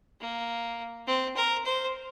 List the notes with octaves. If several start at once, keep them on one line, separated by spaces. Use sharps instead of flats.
A#3
C4
A#4
C5